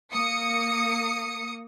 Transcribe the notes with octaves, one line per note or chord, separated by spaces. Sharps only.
A#3 D#6 C#7